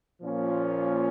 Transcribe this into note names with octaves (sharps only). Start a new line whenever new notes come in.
A#2 F3 A#3 C#4 F4